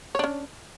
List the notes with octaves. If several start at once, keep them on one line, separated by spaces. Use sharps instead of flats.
C#4 D4 C#5